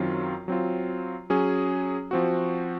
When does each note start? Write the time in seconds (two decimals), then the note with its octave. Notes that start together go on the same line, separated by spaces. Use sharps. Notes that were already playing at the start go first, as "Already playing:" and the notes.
Already playing: F#2 D#3 F#3 C4 F4
0.48 F#3 C4 F4
1.30 F#3 C#4 G#4
2.11 F3 C4 F#4